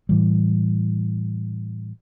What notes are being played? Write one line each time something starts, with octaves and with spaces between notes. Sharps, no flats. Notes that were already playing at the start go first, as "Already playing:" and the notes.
A2 E3 G3